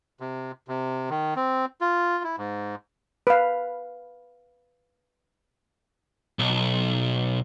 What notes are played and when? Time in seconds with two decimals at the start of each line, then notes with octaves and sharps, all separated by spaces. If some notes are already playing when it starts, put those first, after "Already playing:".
0.20 C3
0.68 C3
1.10 D#3
1.36 C4
1.81 F4
2.24 E4
2.38 G#2
3.27 B4 F5
6.39 B1